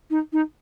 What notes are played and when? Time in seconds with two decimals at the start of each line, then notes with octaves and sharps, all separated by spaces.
0.10 D#4
0.32 D#4